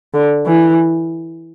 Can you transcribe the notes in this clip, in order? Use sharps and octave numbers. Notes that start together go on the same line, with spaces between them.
D3
E3